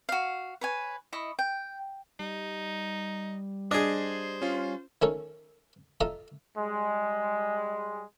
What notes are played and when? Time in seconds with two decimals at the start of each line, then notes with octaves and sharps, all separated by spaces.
0.09 F#4 F5
0.61 B4 C#5 G#5
1.13 E4 D#5 C#6
1.39 G5
2.20 G3 D#4
3.71 D4 G#4 C5 D#5
4.42 C#4 F4
5.02 D#3 A3 C#4 D#4 A4 C#5
6.01 F4 A4 D#5 E5 A5 A#5
6.57 G3 G#3